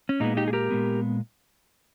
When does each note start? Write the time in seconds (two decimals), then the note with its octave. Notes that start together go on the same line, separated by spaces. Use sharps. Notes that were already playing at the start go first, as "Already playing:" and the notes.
0.09 C#4
0.20 A#2 G#3 B3 D#4
0.37 D#4 G4
0.48 G#4
0.53 G4 A#4
0.70 A#2 G#3 B3